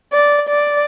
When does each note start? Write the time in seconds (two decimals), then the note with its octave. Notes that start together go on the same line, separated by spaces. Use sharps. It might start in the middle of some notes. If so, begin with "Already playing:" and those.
0.13 D5
0.49 D5